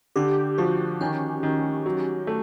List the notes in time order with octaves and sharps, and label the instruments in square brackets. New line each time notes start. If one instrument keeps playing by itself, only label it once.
[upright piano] D3 [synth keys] G4
[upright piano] F3 [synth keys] F#4
[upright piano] D#3 [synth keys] C#4
[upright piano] D#3
F#3
A3